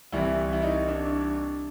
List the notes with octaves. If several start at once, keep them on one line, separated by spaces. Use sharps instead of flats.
C2 C3 E3 E4
E4
D#4
D4